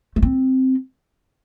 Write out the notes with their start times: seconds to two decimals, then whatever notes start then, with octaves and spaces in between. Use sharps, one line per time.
0.16 A3
0.22 C4